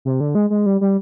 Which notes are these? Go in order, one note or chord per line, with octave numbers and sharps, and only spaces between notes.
C3
D3
G#3
G#3
G3
G3